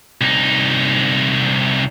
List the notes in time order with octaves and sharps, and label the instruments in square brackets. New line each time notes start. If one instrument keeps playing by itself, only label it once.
[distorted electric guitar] C2 D#4